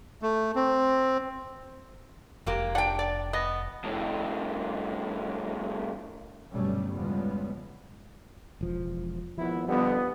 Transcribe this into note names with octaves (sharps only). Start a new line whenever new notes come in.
A3
C4
F1 G#3 A#3 G4
D4 F#5 G5
D5
B3 D#5
F2 A2
G1 B2 F#3 G3 A3 C#4
E2 C#3 F3 G3 G#3 B3
E1 F3
G#1 F3 B3 E4
F2 D3 G3 B3